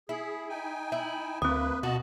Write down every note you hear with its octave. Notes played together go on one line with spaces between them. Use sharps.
E4 G#4
D#4 G5 G#5
E4
D2 A#3 C4 B4 D#6
B2 F#4 D#5 A5